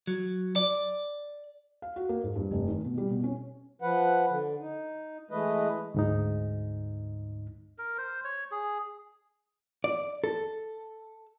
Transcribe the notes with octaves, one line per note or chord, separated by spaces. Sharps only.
F#3
D5
F5
F#4
A#3
G#2
G2
F1
D#3
B2
G3
B2
C#4
F3 B4 F#5
D3
D#4
E3 G#3 A3 B4 D#5
D2 G#2 D#4
A#4
C5
C#5
G#4
D5
A4